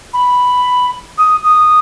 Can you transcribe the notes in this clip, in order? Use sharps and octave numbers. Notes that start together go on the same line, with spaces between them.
B5
D#6
D#6